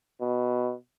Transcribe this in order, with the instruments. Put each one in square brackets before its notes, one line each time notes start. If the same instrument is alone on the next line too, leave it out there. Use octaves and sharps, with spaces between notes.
[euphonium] B2